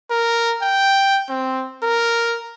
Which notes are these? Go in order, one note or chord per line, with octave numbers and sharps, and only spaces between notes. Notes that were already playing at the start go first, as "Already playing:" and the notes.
A#4
G5
C4
A#4